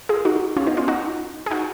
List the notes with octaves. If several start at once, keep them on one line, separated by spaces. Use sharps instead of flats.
F4 G#4
D#4 F#4
C#4 F4
B3 D#4
C#4 F4
D#4 F#4
G#4
D#4 F#4